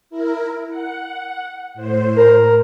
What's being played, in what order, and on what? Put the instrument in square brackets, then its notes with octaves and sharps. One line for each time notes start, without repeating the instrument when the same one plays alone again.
[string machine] E4 A#4
F#5
A2 C5
[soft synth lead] A#4